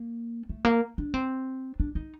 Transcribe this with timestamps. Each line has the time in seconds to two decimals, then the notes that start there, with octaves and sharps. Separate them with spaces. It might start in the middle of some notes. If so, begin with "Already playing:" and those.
Already playing: A#3
0.49 A3
0.65 A#3
0.98 D4
1.14 C4
1.80 D4
1.95 D#4